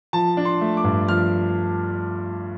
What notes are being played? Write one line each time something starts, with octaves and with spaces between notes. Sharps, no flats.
F3 A5
D4
C6
A3
D6
G2
F3 F6